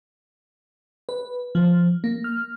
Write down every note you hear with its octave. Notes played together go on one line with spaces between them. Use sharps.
B4
F3
A#3
F6